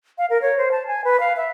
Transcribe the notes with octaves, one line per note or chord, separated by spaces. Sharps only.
F5
A#4
C#5
C5
A5
G#5
B4
F5
E5